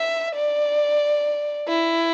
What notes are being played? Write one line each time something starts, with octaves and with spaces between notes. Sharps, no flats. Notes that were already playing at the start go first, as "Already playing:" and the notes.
Already playing: E5
D5
E4